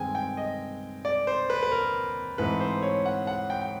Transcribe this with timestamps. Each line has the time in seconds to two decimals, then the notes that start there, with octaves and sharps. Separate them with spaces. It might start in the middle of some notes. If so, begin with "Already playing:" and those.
Already playing: G2 D#3 G#3 C4 G5 G#5
0.15 G5
0.37 D#5
1.05 D5
1.27 C5
1.50 B4
1.63 B4
1.72 A#4
2.38 G#2 E3 A3 C4 B4
2.60 C5
2.82 C#5
3.06 F#5
3.27 F#5
3.50 G5
3.61 G5